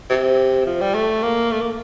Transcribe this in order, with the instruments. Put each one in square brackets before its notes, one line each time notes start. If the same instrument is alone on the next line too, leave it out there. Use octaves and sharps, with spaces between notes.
[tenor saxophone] C3
F3
G3
A3
A#3
A3
A#3